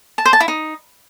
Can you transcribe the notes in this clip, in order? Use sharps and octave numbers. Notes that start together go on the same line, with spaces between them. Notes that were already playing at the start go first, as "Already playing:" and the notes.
A5
C5
A5
E4
D#4